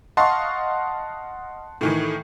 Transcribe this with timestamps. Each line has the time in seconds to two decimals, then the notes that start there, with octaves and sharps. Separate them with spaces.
0.17 D#5 F5 F#5 A5 C6 C#6
1.81 A2 D#3 E3